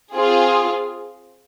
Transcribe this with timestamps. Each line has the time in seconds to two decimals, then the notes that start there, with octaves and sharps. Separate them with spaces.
0.15 C4 F4 G#4